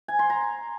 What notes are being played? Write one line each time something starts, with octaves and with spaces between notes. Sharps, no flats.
G#5
C6
A#5